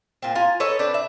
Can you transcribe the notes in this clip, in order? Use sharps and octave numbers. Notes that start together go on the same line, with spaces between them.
A#2 C4
F4 G#5 A#5
A4 B4 C#5 D#5
C4 D4 B4
E5